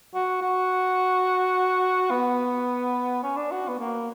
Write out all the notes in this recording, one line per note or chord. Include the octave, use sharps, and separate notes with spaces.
F#4
F#4
B3
C#4
D4
F#4
B3
A#3